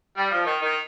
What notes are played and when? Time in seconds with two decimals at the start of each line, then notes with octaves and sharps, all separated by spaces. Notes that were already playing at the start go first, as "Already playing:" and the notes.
0.18 G3
0.31 F3
0.45 D#3
0.62 D#3